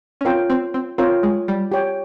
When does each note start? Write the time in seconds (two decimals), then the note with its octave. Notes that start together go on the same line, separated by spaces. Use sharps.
0.21 C#4
0.25 C4 F4 A#4 C#5 G5
0.50 C4
0.74 C4
0.98 C4 F4 A#4 C#5 G5
1.23 G#3
1.48 G3
1.72 G4 C#5 G5